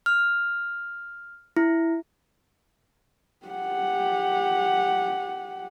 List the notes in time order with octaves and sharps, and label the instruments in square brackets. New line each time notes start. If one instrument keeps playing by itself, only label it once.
[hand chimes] F6
E4
[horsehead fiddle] G4 F#5